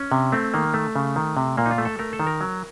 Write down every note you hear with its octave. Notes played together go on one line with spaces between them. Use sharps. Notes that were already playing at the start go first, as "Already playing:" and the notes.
Already playing: C#4
C3
A3 C4
D#3 A#3
A3
C#3
D#3
C3
A#2 A#3
D#4
F4
A3
A4
A3 A#4
A4
D#3
A#4
F#3